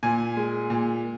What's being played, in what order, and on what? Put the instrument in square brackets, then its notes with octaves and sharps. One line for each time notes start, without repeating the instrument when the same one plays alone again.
[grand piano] A#2 G#5
G#3
A#2